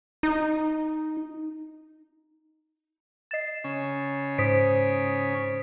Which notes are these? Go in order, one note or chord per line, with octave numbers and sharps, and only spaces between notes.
D#4
D#5 A6 C7 E7
C#3 C#4
G#2 C5 D#6 B6 D7